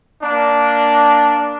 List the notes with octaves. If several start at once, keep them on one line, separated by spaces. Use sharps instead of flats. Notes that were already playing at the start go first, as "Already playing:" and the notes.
A#3 D4